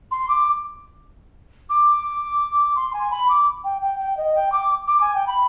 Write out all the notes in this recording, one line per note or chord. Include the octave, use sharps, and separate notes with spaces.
C6
D6
D6
C6
G#5
B5
D6
G5
G5
G5
D#5
G5
D6
D6
G#5
G5
B5